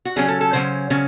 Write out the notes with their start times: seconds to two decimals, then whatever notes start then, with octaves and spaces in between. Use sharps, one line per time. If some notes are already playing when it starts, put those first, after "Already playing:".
0.05 F#4
0.16 C#3 F#3 C#4 G#4
0.28 A4
0.41 A4
0.53 C#3 F#3 C#4 C5
0.90 C#3 F#3 C#4